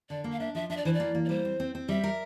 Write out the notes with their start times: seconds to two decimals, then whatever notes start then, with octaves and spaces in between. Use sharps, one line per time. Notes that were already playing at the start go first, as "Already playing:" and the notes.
0.10 D3 D5
0.24 A#3
0.32 F5
0.40 D4 E5
0.55 F3 E5
0.70 D4 E5
0.77 D5
0.85 E3 C5
0.93 D5
1.00 A#3
1.15 A#3
1.25 D5
1.29 G3 C5
1.45 C4
1.60 C4
1.75 C4
1.89 G3 E5
2.04 A#4